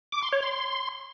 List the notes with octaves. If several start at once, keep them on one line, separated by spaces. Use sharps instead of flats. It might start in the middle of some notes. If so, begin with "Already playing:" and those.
D6
C6
C#5
C6